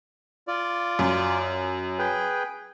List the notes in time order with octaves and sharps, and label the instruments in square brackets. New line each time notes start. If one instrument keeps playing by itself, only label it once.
[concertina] F4 D5
[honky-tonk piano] F#2
[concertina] G#4 B4 G5